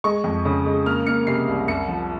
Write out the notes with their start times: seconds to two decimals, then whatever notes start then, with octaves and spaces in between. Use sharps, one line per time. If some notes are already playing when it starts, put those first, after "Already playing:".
0.04 G#3 C#6
0.24 F2
0.45 C#3
0.66 G#3
0.86 A#3 F6
1.07 A#3 C#7
1.27 C3 C7
1.48 C2
1.68 C2 C#7
1.88 F3